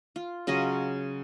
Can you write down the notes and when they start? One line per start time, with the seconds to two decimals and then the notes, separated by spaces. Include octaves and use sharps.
0.16 F4
0.47 C#3 F#3 F4 D#5